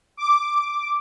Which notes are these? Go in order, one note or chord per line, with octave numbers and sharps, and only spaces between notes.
D6